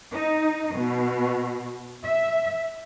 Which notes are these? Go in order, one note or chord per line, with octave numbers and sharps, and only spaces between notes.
D#4
B2
E5